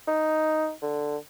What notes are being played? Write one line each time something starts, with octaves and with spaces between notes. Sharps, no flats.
D#4
D3